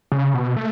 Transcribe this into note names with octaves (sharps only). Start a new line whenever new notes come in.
C#3
B2
A3